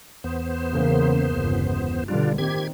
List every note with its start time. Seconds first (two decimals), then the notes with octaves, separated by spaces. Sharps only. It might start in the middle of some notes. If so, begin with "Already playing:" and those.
0.24 E2 B3 C5
0.71 C#3 E3 A#3
1.35 G1 C#2
2.08 B2 D3 G3 D4 F4
2.38 A#2 D#3 C4 G4 G#6